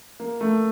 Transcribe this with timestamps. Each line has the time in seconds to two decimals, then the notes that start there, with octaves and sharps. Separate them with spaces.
0.20 A#3
0.41 A3